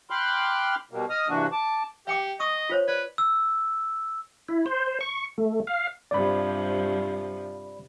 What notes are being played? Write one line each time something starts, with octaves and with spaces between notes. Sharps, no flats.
G5 B5 C6 D6 F6 F#6
B2 G3 A#3
D#5 D#6 F6
G2 C3 E3 A#3 D4 F#4
A5 D6
G4 E5 G5 D6
D#5 C#6 D#6
F4 C5 C#5
B4 D5
E6
E4
C5
C#6
A3
F5
G2 C3 F3 D5 B5